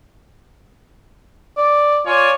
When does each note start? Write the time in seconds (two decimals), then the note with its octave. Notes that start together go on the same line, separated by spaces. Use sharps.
1.57 D5
2.06 F4 C#5 D5 G#5